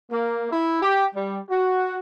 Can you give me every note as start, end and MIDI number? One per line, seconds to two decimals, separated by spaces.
0.11 0.50 58
0.51 0.78 64
0.82 1.04 67
1.15 1.39 55
1.49 1.99 66